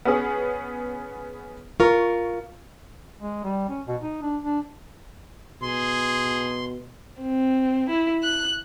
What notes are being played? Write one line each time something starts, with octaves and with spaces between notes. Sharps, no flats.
B3 C#4 G#4
F4 A#4 C#6
G#3
G3
C#4
B2
D#4
D4
D4
B2 G#4 C6
C4
E4
F#6